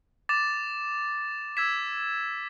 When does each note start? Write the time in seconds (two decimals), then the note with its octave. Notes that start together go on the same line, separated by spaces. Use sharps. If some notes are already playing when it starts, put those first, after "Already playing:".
0.29 D6 A6 E7
1.57 E6 G#6 B6 E7